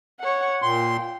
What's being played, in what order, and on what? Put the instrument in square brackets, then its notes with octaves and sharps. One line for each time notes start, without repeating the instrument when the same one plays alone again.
[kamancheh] C#5 F#5
[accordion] A#2 C6 [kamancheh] G5